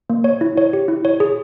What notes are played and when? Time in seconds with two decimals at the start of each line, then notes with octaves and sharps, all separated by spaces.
0.10 A#3
0.24 C#5
0.41 E4
0.57 C#5
0.73 G4
0.88 E4
1.05 C#5
1.20 G#4